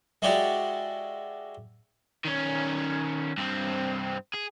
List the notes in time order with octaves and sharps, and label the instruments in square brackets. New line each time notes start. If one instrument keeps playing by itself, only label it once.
[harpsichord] G#3 E4 F#4 G4 D5
[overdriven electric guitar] D#3 C#4
G2 C4
G#4